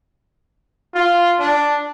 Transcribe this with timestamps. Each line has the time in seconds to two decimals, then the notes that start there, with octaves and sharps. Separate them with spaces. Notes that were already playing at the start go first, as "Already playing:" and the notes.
0.95 F4
1.39 D4